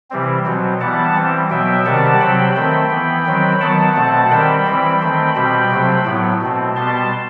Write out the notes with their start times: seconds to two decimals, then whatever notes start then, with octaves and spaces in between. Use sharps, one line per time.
0.10 C3 E3 G3 C4
0.45 B2 F#3 C4
0.81 E3 G3 B3 F#5 A5
1.16 E3 G3 C4
1.50 B2 F#3 B3 E5 G5
1.86 C3 D#3 G3 C4 F#5 A5
2.21 C3 F#3 C4 G5 B5
2.56 D#3 A3 C4 G5 B5
2.91 E3 B3
3.26 D#3 F#3 C4
3.61 D#3 F#3 B3 F#5 A5
3.96 B2 A3 C4
4.31 D#3 G3 C4 G5 B5
4.66 E3 G3 C4
5.01 D#3 A3 C4
5.36 B2 G3 C4 G5 B5
5.71 C3 F#3 A3 C4
6.06 A2 F#3 B3
6.41 B2 A3 C4
6.76 B2 G3 B3 A5 C6